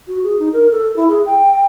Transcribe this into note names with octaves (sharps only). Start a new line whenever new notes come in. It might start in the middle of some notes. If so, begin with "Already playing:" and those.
F#4
G#4
D#4
A#4
A4
E4
G#4
G5